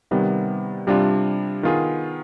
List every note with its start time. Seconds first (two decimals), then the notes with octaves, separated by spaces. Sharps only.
0.11 C3 D#3 G3 B3
0.87 C3 G3 D4 F4
1.63 D#3 B3 F4 G#4